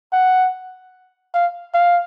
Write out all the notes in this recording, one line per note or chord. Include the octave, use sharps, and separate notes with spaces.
F#5
F5
F5